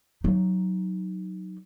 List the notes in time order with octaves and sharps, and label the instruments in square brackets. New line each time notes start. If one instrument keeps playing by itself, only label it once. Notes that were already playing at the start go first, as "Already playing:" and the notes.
[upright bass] F#3 D#4